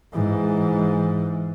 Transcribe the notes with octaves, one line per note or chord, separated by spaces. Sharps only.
G#2 E3